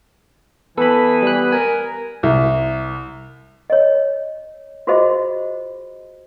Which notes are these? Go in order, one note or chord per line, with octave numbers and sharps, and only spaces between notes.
E3 B3 A4 B4 B5
G3 F#6
A#4 G#5
C2
C#5 D#5
F4 F#4 G#4 C5 D#5 E5